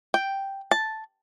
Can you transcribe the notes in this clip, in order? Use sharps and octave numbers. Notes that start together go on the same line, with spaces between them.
G5
A5